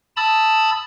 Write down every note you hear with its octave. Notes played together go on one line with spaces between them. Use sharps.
A5 B5 D#6 E6 A6